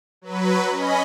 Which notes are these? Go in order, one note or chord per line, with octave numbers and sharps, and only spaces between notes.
F#3 B4
C#4 D#5 B5